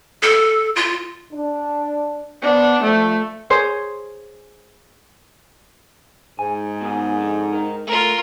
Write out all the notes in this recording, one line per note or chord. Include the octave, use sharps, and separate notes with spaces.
A4
F4
D4
B3 D4 C5
F3 A3
G#4 C5 C#5
G#2 G#5
B2 D#3 G#4
F2 D3
D#4 A#4
A3 F4 A#4